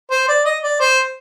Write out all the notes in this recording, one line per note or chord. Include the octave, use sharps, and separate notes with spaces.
C5
D5
D#5
D5
C5